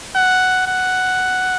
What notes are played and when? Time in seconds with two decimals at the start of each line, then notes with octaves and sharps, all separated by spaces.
0.15 F#5
0.67 F#5